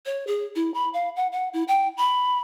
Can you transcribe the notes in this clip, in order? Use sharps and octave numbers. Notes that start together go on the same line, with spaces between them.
C#5
G#4
E4
B5
F5
F#5
F#5
E4
G5
B5